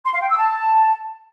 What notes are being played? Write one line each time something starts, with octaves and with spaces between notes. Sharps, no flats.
C6
F5
G5
E6
A5